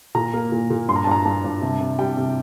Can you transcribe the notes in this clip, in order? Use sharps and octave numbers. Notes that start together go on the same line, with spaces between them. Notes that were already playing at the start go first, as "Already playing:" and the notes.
A#2 A#5
A#3
A#2
A#2
G2 C6
A#5
A5
G2 A#5
G2 A5
G2
C3
C3
G3 G5
C3